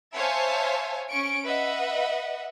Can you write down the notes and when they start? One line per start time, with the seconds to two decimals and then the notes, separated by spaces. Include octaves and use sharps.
0.15 C5 C#5 E5 F5 G#5 A5
1.10 C#4 C#6 D7
1.46 B4 D#5 E5 F#5